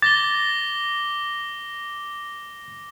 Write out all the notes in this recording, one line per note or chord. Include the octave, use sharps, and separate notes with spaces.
D6 A6 A#6 G7